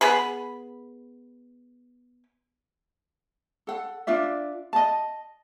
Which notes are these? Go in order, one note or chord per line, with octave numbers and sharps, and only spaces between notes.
B3 G#4 B5
A4 F#5
D4 F4 D5 E5
D#5 A5